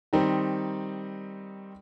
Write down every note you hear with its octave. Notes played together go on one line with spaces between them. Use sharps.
D#3 G3 C4 D#4